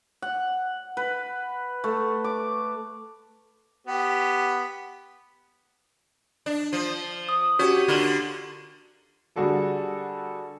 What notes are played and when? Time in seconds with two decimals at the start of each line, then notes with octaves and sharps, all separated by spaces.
0.22 F#5
0.97 B4
1.84 A3
2.24 D6
3.87 B3 G4
6.46 D4
6.73 F3
7.29 D#6
7.59 C#4 F#4 G4
7.88 D3 A#3 F4
9.36 D3 G3 F#4 G#4 A4 D5